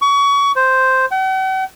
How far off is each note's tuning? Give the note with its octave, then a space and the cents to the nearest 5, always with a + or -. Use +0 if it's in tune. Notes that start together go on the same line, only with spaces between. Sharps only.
C#6 +30
C5 +0
F#5 +45